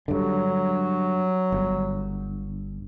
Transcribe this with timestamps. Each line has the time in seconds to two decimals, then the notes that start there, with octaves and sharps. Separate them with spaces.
0.08 G2 D3 F#3
1.52 G1